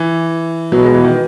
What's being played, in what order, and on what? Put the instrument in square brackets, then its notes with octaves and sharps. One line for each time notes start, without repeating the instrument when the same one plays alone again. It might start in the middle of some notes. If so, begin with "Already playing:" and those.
Already playing: [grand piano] E3
[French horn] B2 [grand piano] F#3
[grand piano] G#3
E3
D#3